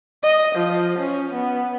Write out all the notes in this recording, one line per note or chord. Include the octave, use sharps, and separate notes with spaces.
D#5
F3
C#4
B3